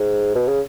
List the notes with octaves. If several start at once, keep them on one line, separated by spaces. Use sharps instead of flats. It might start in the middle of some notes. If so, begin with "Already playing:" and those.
Already playing: G#2
B2
C#3